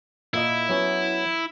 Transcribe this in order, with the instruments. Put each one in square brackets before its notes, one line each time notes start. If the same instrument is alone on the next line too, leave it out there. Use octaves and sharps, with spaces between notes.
[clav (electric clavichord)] A#2 A#3 D#5 [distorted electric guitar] E4
[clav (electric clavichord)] F#3 B3 C#4